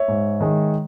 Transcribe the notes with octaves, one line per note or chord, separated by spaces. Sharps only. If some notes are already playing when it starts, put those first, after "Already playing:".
Already playing: C#5 E5
G#2
D#3 G#3